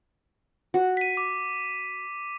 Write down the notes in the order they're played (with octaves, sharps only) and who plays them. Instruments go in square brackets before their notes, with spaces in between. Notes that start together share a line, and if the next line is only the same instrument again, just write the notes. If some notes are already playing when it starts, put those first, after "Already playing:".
[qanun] F#4
[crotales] B6 D#7
D6